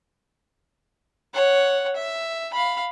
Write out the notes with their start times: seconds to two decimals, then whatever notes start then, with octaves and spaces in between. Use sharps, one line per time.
1.34 C#5 F#5
1.96 E5
2.53 F5 B5